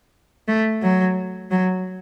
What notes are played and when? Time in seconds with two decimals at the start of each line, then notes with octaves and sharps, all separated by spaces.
0.48 A3
0.82 F#3
1.51 F#3